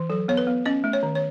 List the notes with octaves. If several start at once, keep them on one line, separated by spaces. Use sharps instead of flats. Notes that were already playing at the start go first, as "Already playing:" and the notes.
Already playing: E3
F#3 A4
B3 C#5
B4
B3
C#4 D#5
A3
C#5
D#3
C#5